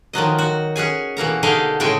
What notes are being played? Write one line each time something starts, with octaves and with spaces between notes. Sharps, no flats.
D#3 F3 F#3 D#5
F#4
C#4 F#4 G#4 G#5
B2 E3 A#3 A#5
D3 D#4 G4 G#4 D#5 F5
A2 C#3 G#3 G5 G#5